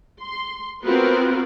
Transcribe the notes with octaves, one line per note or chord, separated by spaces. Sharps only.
C6
B3 C4 F4 F#4 A#4 B4